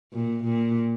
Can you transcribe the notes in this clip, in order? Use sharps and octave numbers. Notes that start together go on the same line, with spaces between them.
A#2
A#2